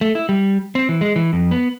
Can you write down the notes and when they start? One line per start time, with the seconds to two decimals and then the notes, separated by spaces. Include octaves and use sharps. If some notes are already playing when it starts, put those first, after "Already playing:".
0.01 A3
0.15 E4
0.29 G3
0.75 C4
0.89 E3
1.01 G#3
1.16 E3
1.33 F2
1.51 B3